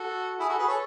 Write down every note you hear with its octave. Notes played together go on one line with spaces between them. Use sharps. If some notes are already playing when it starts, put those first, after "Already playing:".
Already playing: F#4 A4
E4 G#4
F#4 A4
G#4 B4
A4 C#5